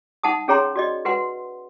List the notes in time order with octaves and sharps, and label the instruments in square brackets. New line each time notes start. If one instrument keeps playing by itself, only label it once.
[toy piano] D#4 F#5 A5 D#6
C#4 G#4 C#5 A#5 C6
F#4 D5 D#5
F#4 B4 F#5 C6